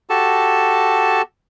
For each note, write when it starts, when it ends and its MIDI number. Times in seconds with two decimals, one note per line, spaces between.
0.10 1.22 66
0.10 1.22 67
0.10 1.22 69
0.10 1.22 81